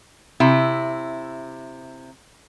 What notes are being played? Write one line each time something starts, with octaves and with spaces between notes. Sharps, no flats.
C3 E4